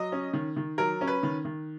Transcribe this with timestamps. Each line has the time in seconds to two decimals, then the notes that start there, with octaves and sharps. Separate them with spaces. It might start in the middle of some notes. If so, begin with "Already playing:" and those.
Already playing: F#3 D#5
0.12 C#4
0.33 D#3
0.56 D#3
0.78 F#3 A#4
1.01 C#4
1.07 B4
1.23 D#3
1.45 D#3